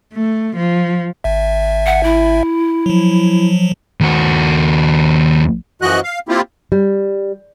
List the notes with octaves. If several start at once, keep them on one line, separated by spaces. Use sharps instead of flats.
A3
F3
G#1 E5
F#5
E4
F3 F#3
D#2 F#4
F#2 E3 F3 F#4 D#5 F#6
F5
A#3 C4 E4 F4 G4
G3